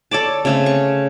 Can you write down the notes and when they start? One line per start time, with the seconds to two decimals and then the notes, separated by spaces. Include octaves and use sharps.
0.11 A4 C#5 D5 A5
0.45 C#3 A3 C4
0.66 C#6